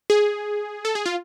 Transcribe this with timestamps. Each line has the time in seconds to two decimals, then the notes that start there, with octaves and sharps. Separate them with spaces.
0.10 G#4
0.85 A4
0.95 G#4
1.06 F4